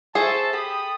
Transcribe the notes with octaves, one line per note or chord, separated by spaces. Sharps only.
G#4 A4 C5 E5 A5 C#6
G4 A4 B5 D#6